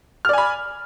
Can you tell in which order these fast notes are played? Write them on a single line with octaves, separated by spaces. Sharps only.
F6 D5 G#5 B5